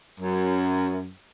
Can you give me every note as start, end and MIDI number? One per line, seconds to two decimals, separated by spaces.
0.20 1.10 42